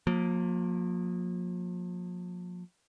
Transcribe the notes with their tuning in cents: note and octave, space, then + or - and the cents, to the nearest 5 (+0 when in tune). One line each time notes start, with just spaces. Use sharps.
F3 +40 A#3 +0